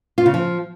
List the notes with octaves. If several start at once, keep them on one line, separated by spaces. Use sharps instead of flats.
F4
C#3
F3